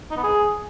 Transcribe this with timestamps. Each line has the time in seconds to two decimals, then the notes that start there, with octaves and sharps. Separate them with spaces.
0.11 D#4
0.17 B3
0.24 G#4